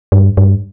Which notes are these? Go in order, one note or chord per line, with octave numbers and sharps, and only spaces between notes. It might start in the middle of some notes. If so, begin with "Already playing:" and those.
G2
G2